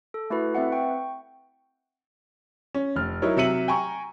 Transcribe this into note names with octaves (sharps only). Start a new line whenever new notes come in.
A4
A3 E4 F#4 A4 B4
C4 B4 E5 F#5
G5 C#6
C#4
F1 F6
F#3 D#4 E4 A#4 C#5
C3 F#3 E5 C#7 D#7 F#7
G5 G#5 A#5 C#6